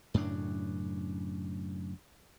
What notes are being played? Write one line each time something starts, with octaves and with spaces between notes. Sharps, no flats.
F#2 A2 C#3 D4